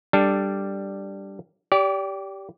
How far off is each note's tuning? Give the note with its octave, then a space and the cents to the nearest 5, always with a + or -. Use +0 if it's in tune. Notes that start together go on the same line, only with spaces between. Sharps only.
G3 +0 D4 +0 A4 +0
G4 -5 D5 -35